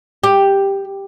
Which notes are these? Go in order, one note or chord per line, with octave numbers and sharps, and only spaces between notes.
G4